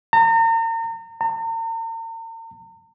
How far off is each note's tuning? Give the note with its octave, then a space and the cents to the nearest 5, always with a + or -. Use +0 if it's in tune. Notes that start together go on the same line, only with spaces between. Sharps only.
A#5 -40
A#5 -45